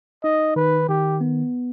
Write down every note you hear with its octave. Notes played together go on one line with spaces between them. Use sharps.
D#4 D#5
D#3 B4
D#3 G4
B3